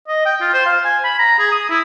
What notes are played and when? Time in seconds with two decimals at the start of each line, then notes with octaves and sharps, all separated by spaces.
0.08 D#5
0.26 G5
0.41 F4
0.54 C5
0.66 F5
0.85 G#5
1.05 B5
1.19 A#5
1.39 G#4
1.52 D#6
1.70 E4